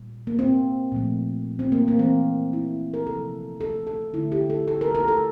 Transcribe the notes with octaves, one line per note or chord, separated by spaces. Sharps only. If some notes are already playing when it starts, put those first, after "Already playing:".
Already playing: A#2 G3
A#3
C4
A#2 F3 A3
C4
A#3
A#3
E3 A3 C4
E4
A#4
C3 F3 A3 A4
A4
A4
D3 A3 E4
G4
A4
A4
A#4
A#4
A4